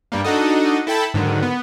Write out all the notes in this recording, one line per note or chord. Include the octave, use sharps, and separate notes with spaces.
G2 G3 A#3
D4 D#4 F#4 A4 D#5
E4 A4 G5 A5 B5
G#2 D3 D#3 F#3
B3